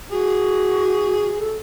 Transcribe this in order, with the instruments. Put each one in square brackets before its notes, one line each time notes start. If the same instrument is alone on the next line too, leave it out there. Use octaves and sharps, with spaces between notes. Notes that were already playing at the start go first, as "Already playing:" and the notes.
[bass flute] F#4 [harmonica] G#4
[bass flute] A4